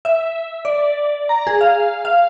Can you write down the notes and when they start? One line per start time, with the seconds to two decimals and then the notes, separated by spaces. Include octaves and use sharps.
0.05 E5
0.65 D5
1.29 A#5
1.47 G#4
1.61 F5
2.05 F5